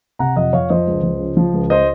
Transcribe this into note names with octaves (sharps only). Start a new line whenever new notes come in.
C3 F#5 A#5
F2 D#5 F#5
F2 C#5 F5
F3 C5 D#5
C#2
F3
C#3
F3
C#2
C5 D#5